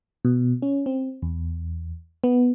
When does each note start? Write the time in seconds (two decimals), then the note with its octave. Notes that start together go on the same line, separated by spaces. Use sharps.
0.25 B2
0.62 C#4
0.86 C4
1.22 E2
2.24 B3